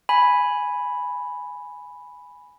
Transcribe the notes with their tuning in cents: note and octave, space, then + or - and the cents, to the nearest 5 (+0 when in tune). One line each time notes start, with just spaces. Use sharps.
G#5 +0 B5 +0